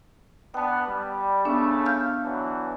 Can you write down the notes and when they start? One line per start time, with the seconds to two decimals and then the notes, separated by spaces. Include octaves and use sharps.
0.54 B3 D4 G5 A5
0.88 G3
1.45 C#3 A3 B3 C#4 D4
1.86 F5 F6 G6
2.24 E3 F#3 D4